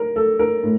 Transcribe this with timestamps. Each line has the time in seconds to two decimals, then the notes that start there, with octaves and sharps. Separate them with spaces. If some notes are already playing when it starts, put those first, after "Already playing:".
Already playing: A#4
0.16 A4
0.39 A#4
0.63 A2